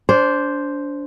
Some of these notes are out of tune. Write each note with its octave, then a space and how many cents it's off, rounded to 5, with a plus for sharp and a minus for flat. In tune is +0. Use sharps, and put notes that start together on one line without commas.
D4 -25 C5 +0